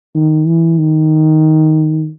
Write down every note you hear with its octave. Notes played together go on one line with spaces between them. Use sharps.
D#3
E3
D#3